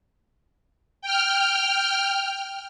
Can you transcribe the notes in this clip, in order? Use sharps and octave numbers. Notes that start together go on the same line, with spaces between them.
G5 F6